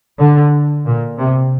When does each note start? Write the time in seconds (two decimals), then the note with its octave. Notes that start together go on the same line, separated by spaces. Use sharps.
0.19 D3
0.86 A#2
1.19 C3